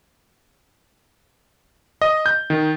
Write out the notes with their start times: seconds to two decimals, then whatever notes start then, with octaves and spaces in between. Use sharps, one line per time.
2.02 D#5
2.26 G6
2.50 D#3